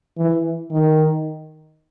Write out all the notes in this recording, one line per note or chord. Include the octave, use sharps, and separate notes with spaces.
E3
D#3